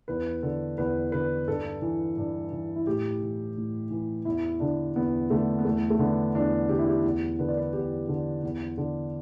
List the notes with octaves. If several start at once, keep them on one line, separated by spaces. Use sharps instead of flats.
E2 B4
D3 A4
E2 B4
D3 B4
G2 A4
E3
G2
E3
E4
A2 G4
E3
A2
E3
E2 E4
D3 D4
E2 B3
D3 A3
B3
E2 A3
A3
D3 B3
E2 D4
D3 G4
E4
G4
E2
D3 B4
D5
B4
E2 G4
D3
E2
D3